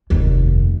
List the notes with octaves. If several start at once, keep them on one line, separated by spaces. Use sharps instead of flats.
F1 D#2